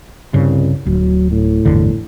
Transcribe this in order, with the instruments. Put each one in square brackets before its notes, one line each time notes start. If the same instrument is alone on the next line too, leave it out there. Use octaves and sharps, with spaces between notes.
[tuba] C2 [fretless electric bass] G2 C#3
[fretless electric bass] D1 [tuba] F#3
[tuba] A2
[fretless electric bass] G1 E2 D3